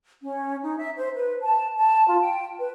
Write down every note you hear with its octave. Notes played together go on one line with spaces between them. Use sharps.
C#4
D#4
E5
C5
B4
A5
A5
F4
G5
B4